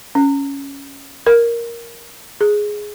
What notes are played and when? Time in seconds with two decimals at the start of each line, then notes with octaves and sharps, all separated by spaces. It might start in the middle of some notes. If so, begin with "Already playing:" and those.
0.15 C#4
1.26 A#4
2.41 G#4